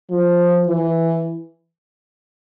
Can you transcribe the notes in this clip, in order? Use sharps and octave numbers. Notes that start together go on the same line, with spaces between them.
F3
E3